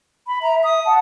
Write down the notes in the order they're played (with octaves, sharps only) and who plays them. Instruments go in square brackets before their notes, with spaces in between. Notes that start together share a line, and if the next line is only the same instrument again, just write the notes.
[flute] B5
[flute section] E5 [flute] A#5
[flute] D#6
[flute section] F#5 A5